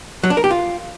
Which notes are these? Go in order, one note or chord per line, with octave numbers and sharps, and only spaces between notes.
F#3
D4
A#4
G4
F4